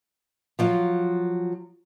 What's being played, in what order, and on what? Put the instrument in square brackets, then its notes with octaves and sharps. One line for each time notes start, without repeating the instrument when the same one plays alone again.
[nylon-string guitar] F3 F#3 F4